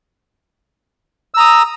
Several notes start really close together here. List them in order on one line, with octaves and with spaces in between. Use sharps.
E6 A#5 D#6